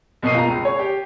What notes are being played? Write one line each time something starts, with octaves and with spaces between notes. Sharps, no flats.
F#1 B2 D#5 C7 D#7
F4 A#5
C#2
C#5
G4